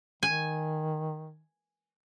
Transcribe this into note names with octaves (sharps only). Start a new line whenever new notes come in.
D#3 G#5